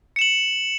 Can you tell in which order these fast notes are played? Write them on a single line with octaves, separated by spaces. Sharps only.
C#7 E7 F#7